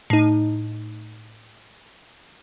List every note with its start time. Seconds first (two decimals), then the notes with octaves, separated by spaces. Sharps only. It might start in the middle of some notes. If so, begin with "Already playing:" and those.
0.10 A2 D#4